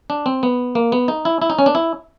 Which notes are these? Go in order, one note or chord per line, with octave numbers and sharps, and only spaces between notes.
D4
C4
B3
A#3
B3
D#4
E4
E4
D#4
C#4
D4
E4